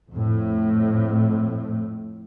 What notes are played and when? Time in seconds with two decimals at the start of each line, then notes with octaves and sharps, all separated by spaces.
0.11 F2 A2